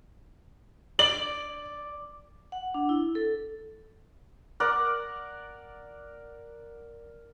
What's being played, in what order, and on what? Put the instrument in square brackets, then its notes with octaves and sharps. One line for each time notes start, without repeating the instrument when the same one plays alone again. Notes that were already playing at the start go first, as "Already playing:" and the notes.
[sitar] D5 [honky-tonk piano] F#7
[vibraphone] F#5
D4
E4
A4
[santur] A#4 D5 F#5